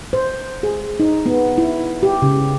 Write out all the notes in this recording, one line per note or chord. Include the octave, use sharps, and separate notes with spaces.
C5
G#4
D#4
B3
E4
G4
C#3